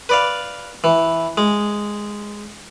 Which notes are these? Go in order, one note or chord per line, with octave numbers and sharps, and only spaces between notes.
B4 D5 F5
E3
G#3